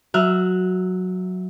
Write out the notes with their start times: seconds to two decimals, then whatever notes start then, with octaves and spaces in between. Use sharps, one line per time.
0.14 F#3 E5 F6 F#6